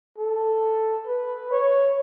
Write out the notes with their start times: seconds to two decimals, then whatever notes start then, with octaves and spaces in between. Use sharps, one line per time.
0.18 A4
1.07 B4
1.51 C#5